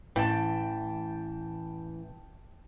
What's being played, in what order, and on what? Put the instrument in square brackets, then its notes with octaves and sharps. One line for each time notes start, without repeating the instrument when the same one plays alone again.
[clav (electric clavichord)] A1 [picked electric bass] E3 [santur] G5 A5